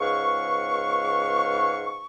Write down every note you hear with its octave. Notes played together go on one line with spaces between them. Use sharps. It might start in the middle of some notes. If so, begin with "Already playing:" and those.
C#2 G#2 B4 F5 C#6